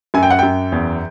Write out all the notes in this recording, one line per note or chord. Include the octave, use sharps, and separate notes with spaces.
F#2 G#5
G5
F#5
F#2 G5
E2